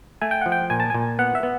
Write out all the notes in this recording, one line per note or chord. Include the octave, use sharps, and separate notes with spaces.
A3 G#5
G5
F3 F#5
G5
A#2 G#5
A5
A#2 G#5
B3 F#5
E5
B3